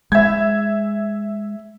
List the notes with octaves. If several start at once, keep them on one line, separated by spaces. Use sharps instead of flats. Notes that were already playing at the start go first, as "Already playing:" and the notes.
G#3 E5 G#6